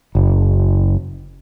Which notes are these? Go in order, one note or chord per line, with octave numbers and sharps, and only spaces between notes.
F#1